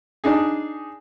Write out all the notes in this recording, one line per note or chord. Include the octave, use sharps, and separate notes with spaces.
D4 D#4 G#4